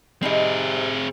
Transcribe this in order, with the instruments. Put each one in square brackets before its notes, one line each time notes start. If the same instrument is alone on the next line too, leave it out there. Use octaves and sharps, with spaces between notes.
[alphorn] C3 [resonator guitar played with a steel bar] G3 D#4 D#5 [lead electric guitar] C4 G#4